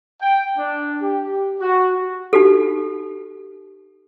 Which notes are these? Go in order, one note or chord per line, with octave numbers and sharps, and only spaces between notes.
G5
D4
G4
F#4
D#4 F#4 G4 A4